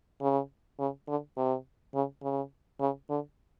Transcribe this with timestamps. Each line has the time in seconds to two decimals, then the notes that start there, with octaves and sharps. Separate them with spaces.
0.21 C#3
0.79 C#3
1.08 D3
1.37 C3
1.94 C#3
2.23 C#3
2.80 C#3
3.10 D3